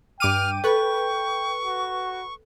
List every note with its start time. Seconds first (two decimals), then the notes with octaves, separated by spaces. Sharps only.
0.20 G2 G5 D6 F6 D#7
0.64 A4 B4 C#6
1.65 F#4